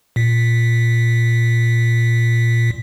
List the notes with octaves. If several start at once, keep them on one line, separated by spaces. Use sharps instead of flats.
A#2 B6